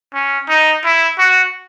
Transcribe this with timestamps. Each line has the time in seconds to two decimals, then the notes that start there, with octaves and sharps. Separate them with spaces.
0.14 C#4
0.49 D#4
0.84 E4
1.18 F#4